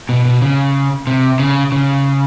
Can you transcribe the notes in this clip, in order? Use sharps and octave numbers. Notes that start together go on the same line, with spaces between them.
B2
B2
C#3
C3
C#3
C#3